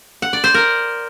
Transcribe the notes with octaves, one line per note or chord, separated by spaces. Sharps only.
F#5
D5
C5
A#4